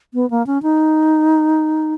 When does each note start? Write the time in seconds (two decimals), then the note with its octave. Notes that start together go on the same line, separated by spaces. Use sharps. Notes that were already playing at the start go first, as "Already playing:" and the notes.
0.14 B3
0.30 A#3
0.47 C#4
0.63 D#4